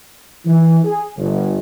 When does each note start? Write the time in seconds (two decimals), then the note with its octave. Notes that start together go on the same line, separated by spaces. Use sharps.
0.45 E3
0.84 G#4
1.17 G1